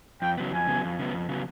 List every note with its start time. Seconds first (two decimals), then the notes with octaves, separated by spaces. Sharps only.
0.22 F2 G5
0.38 C#3 F#3 B3
0.53 F2 G#5
0.67 C#3 F#3 B3
0.84 F2
0.99 C#3 F#3 B3
1.13 F2
1.29 C#3 F#3 B3